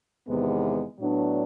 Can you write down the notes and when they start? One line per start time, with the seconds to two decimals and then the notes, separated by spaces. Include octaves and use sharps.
0.28 E2 C3 D#3 G#3 B3
1.00 A2 F#3 B3 D4